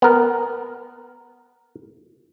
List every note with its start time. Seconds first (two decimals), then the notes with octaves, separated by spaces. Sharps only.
0.02 B3 A#4